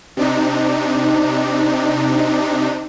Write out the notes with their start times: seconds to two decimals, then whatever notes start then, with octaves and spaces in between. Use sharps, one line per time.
0.17 C3 D4 D#4